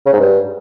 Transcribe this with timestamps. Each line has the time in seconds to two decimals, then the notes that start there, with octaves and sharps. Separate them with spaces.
0.06 C#3
0.13 G#2
0.19 G2